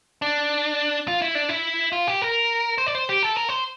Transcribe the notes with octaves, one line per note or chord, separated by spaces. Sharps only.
D4
F4
E4
D4
E4
F4
G4
A#4
C5
D5
C5
G4
A4
A#4
C5